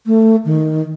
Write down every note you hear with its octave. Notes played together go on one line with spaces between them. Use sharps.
A3
D#3